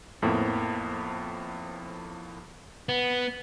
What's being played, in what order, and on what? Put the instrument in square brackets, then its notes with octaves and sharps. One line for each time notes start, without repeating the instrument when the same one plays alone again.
[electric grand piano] F2 A2 F3 A#3 B3
[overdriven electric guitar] B3